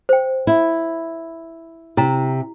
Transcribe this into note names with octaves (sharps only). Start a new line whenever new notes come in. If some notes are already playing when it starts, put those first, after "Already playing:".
C5 G5
E4
C3 E4 A#5